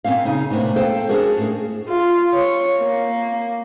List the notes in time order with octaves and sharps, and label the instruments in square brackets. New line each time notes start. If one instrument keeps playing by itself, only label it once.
[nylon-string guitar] A#2 E3 C4 C#4 F5
C#3 D#4 G#5
A2 C3 A#3 B3 D4
A4 B4 C5 F5 G5 A5
C#4 D4 F#4 G#4 A#4
A2 G#4
[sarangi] F4
C#5
A#3